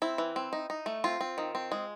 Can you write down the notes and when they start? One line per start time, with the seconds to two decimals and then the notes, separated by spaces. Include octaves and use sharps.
0.02 C4 E4
0.18 E3
0.36 C4
0.53 D#4
0.70 D#4
0.86 A3
1.04 C4 F4
1.21 C4
1.38 D#3
1.55 C4
1.72 G#3